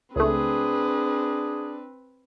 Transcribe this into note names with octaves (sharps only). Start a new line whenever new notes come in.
C#2 A3 C4 D4 G#4 B4